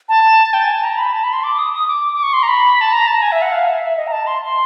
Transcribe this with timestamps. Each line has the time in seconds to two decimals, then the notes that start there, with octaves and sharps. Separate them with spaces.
0.09 A5
0.54 G5
0.64 G#5
0.74 A5
0.84 A#5
0.98 B5
1.13 A5
1.24 B5
1.33 C6
1.44 D6
1.58 D#6
1.73 D#6
1.88 D6
2.13 D6
2.23 C#6
2.33 C6
2.43 A#5
2.48 B5
2.81 A5
2.93 A#5
3.07 A5
3.22 G#5
3.32 E5
3.42 F#5
3.52 F5
3.67 E5
3.82 E5
3.97 D#5
4.07 A#5
4.12 A5
4.27 C6
4.42 C6